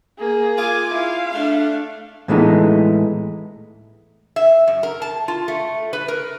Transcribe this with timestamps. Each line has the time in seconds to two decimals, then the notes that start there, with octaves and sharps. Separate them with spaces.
0.19 A#3 G#4
0.58 F4 G#5 D6
0.91 E4 F5
1.34 A3 D4
2.28 A2 E3 G#3 A3 B3 D#4
4.36 E5
4.67 F#2
4.83 A#4
5.02 A5
5.28 F4
5.48 A3
5.93 B4
6.08 A#4